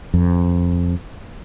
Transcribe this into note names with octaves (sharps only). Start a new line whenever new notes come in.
F2